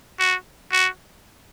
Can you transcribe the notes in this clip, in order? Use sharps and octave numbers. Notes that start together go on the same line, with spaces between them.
F#4
F#4